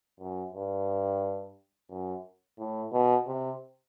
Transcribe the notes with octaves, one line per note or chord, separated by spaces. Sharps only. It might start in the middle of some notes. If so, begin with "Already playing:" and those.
F#2
G2
F#2
A2
B2
C3